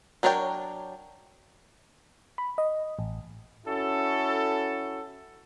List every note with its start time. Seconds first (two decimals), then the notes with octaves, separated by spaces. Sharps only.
0.23 F#3 D4 A#4 C#5 G5
2.38 B5
2.58 D#5
2.99 A1
3.66 C#4 E4 F#4 A4